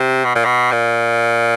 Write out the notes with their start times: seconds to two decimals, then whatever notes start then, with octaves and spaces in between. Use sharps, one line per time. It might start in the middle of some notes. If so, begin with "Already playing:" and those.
Already playing: C3
0.25 B2
0.35 A#2
0.45 B2
0.72 A#2